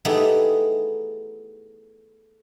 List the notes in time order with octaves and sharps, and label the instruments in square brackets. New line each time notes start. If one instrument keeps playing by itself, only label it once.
[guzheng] A3 B3 D#4 E4 G4 G#4